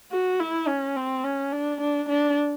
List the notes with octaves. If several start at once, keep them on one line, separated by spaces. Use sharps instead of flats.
F#4
E4
C#4
C4
C#4
D4
D4
D4